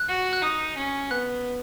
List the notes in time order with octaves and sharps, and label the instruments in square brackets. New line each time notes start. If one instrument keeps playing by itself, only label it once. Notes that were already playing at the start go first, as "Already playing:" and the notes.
Already playing: [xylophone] F#6
[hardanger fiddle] F#4
[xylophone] F#6
[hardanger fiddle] D#4 [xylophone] D#6
[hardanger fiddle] C#4
[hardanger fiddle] B3 [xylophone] F#6